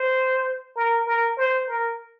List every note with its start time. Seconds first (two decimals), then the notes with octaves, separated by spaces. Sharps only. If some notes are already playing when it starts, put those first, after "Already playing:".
Already playing: C5
0.76 A#4
1.07 A#4
1.37 C5
1.68 A#4